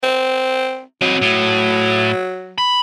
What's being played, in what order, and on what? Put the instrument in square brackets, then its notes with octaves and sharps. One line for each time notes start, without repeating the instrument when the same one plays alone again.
[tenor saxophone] C4
[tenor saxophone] F#3 [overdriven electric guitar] C4 D#5
[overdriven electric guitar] A2
B5